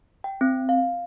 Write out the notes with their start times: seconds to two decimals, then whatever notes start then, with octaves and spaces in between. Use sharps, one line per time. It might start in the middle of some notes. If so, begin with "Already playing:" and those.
0.24 G5
0.41 C4
0.69 F5